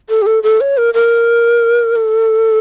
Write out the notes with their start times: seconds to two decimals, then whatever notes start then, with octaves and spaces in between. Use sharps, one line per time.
0.10 A4
0.22 G4
0.26 A4
0.43 A4
0.61 C#5
0.77 A#4
0.94 A#4
1.96 A4